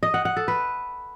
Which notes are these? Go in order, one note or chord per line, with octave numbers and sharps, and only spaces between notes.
D#5
F#5
F#5
A4
B4